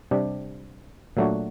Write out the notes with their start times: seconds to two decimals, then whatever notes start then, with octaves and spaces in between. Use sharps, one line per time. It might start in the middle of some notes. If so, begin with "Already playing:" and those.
0.11 C3 G3 D4 G4
1.17 A#2 F#3 A3 D4 F#4